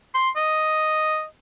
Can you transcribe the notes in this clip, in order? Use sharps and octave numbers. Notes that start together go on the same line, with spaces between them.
C6
D#5